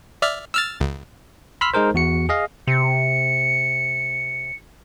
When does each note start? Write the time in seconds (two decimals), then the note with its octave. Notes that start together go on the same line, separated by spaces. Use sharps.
0.22 D5 E5 F6
0.54 E6 F6 A6
0.80 C#2
1.61 B5 C6 E6 F6 B6
1.74 G#3 D#4 G#4 A#4 C5
1.94 E2 F#4 C#7
2.29 G#4 D#5 F5
2.67 C3 C#7